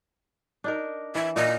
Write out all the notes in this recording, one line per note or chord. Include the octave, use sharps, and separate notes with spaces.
D4 D#4 A#4
E3 E5
A#2 D#5